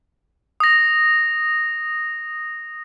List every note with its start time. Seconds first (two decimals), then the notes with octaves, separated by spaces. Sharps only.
0.60 D#6 A#6